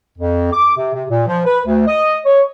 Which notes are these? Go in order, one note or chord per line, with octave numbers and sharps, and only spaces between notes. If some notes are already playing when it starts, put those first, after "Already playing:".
F2
D6
C3
C3
A#2
F3
B4
D2
D#5
C#5